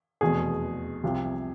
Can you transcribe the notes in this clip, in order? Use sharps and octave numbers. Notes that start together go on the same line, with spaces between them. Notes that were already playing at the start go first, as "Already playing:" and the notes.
F1 E2 B2 G#4
C2 C3 F3